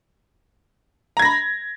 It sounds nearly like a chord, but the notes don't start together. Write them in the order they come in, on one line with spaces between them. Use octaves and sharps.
A#5 G#6 A#6 B5